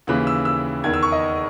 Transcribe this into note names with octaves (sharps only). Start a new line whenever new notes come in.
D#2 C#3 E3 F#6
E6
E6
E2 D#3 G#6
E6
C#6
D#5